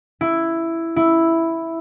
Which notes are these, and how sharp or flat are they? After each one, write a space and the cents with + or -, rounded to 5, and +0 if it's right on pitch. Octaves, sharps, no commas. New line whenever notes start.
E4 +5
E4 +0